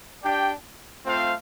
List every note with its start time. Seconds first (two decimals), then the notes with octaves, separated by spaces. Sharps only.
0.23 D4 G4 D5 G5
1.05 A3 C4 F4 C5 F5